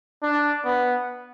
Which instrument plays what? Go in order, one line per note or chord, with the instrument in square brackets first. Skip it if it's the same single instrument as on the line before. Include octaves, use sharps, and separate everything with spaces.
[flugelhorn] D4
B3